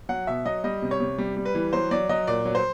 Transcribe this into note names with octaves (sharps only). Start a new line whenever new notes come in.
F#3 F#5
B2 E5
F#3 D#5
G3 D#5
C3
C#5
C3
G3
G3
B4
E3
F#3 C5
F#3 D5
F#3 D#5
A#2 D5
F#3
C5